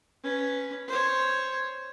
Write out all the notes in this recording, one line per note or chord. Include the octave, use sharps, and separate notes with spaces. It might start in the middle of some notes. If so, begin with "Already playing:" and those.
C#4 B4
C5 C#5